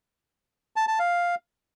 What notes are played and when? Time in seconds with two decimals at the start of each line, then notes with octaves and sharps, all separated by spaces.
0.76 A5
0.88 A5
0.99 F5